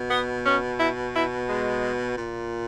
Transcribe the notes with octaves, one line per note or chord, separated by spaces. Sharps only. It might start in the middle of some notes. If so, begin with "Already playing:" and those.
Already playing: B2
B3
C#4
E4
E4
G#3
A#2